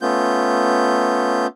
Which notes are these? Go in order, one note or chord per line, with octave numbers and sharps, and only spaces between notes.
A3 B3 C#4 F4 G6